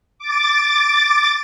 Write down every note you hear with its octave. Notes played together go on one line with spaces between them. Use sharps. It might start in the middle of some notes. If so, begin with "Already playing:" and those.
D6 A6